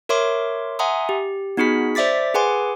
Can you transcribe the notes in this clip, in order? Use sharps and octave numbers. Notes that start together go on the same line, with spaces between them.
A#4 C#5 E5 C6 D6
E5 F#5 G#5 A#5 C6 D#6
G4
B3 D#4 F#4 G#4 B5 B6
C5 D5 E5 D6 A6 B6
G#4 B4 F#5 G#5 C6 D6